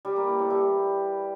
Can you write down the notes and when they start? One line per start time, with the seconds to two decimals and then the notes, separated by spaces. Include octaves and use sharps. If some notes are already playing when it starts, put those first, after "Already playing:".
0.05 G3
0.16 A#3
0.27 E3
0.39 A2
0.50 G3